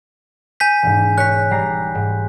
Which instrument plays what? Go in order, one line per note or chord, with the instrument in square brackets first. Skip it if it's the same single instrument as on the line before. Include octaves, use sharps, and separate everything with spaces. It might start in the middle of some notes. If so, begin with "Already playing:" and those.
[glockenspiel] G#5 G6 B6
[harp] E1 G#2
[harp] C#5 [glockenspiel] F#6 B6
[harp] G3 A#5 C7
G#2